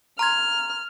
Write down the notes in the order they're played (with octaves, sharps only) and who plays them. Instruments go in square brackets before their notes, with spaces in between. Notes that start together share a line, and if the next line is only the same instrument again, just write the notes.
[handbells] A#5 C6 G#6 [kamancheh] F6